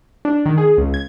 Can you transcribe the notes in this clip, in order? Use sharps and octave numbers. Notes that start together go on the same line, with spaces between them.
D4
D#3
G#4
C#2
G#6